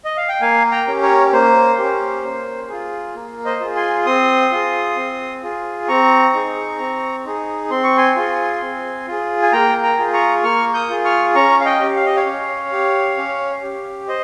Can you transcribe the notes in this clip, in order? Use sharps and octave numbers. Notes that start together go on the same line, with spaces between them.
D#5
F5
G5
A#3 F5 G#5
G5 A#5
C#4 G4
A#4 C#5
A#3 C5
C#4 G4
A#3
F4 G#4
A#3
C5 D#5
F4 G#4
G#5 C6
C4 C6 D#6
F4 G#4
C4
F4 G#4
C4 A#5 C#6
D#4 G#4
C4
D#4 G#4
C4 C6
C#6
G#5 C6
F4 G#4
C4
F4 G#4
G#5
A#3 G5 A#5
G5 A#5
F4 G#4
A#5 C#6
A#3 C#6 F6
D#6 G6
F4 G#4
C#6 F6
C#4 A#5 C#6
F5
D#5 G5
G4
F5
D#5
C#5 F5
C#4
G4
C#4
G4
C5 D#5